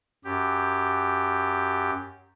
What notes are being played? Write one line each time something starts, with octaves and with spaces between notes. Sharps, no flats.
F#2 G4